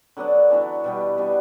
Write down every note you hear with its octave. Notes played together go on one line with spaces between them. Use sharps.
D3 F#3 B3 D4
E3 B3 D4 F#4
B2 G3 B3
B2 G3 B3 D4